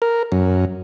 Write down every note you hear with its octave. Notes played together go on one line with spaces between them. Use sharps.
A#4
F#2